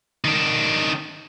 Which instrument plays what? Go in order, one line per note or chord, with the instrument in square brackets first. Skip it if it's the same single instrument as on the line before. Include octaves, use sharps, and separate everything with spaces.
[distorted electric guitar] D#3 D4